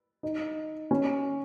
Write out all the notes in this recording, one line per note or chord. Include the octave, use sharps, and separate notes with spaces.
D#4
C#4